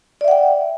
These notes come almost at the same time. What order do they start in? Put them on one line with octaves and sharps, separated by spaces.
D5 E5 F#5 G5